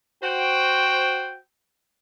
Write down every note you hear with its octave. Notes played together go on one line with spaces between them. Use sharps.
F#4 C5 G5